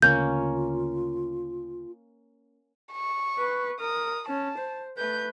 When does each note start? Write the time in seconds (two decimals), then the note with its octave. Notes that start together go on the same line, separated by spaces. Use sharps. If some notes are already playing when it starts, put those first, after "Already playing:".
0.02 D2 C#3 A#3 C#4 F4 G6
2.93 C#6
3.39 B4
3.80 A#4 D#6
4.28 C#4 A5
4.58 C5
4.98 A3 B4 G6